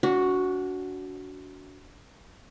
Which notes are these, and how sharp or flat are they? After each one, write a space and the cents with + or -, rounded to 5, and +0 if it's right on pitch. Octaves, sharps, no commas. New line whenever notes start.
D4 -35 F#4 +0